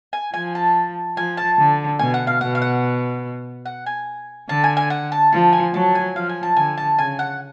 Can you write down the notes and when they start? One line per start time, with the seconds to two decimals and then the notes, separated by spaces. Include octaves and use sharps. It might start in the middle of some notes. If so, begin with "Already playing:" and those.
0.13 G#5
0.34 F3 G#5
0.55 A5
1.17 F3 G#5
1.37 A5
1.59 D3
1.99 B2 G#5
2.14 F#5
2.27 F5
2.41 B2 F#5
2.55 F5
2.62 F#5
3.66 F#5
3.86 G#5
4.49 D3 A5
4.64 G#5
4.77 G#5
4.90 F#5
5.12 A5
5.32 F3 A5
5.53 G#5
5.74 F#3 A5
5.95 G#5
6.15 F3 F5
6.29 G#5
6.43 A5
6.56 D3 G#5
6.78 A5
6.99 C#3 G#5
7.19 F#5